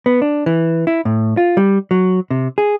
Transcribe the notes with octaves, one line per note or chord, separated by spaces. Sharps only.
B3
D4
E3
E4
A2
F4
G3
F#3
C3
G#4